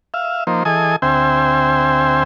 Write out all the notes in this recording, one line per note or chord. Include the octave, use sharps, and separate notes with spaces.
E5 F5
F3 A#3 D#4 C5
E3 G#4 A4 D#5 G#5 D#6
D2 C4 C5 E5 G5 G#5